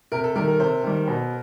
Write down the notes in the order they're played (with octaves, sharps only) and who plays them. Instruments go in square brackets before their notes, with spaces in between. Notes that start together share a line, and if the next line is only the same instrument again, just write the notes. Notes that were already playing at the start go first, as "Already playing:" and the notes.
[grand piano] C3 [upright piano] A#4
[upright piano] A4
[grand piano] D#3 G3 [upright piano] A#4
[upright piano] A#4
[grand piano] C3 [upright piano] C5
[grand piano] D#3 G3
B2